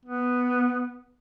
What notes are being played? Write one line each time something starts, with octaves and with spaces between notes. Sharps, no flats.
B3